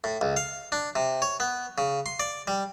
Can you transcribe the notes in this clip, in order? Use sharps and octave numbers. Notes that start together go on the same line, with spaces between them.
A2
C#2
F5
D4
C3
C#5
B3
C#3
C6
D5
G3